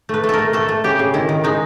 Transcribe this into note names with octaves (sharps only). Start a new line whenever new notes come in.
A3 B4
A3
A4 A#4
A3
A3 A4
A3
C#3 G4
C#3
D#3 E4
D#3
G#3 D#4